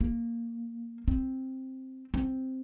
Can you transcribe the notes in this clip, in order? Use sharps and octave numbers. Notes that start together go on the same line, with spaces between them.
A#3
C4
C4